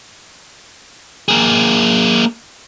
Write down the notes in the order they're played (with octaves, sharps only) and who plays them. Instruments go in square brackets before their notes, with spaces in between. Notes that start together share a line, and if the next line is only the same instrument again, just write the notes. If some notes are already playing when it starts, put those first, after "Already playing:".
[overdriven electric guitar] A#3 G#4